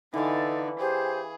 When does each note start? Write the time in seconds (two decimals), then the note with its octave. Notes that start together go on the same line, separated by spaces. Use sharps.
0.14 D3 E3 D#4 A4 F5
0.79 G4 G#4 C5